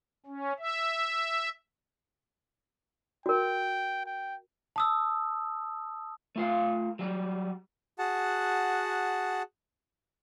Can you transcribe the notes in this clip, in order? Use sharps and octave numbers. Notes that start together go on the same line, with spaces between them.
C#4
E5
F#4 A#4 G5
G5
A5 D#6 E6
A3 F4 F5
F#3 G3
F#4 G#4 F#5 A5